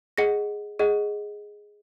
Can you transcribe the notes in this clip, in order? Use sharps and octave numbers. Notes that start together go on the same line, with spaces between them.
G#4 D#5 F#5 A#6 C#7
G#4 D#5 F#5